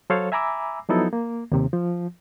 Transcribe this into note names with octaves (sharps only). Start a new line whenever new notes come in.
F#3 A4 C5 C#5 F5
E5 G#5 A#5 B5 D6 E6
F3 F#3 B3 D#4 E4 A4
A#3
D#2 C3
F3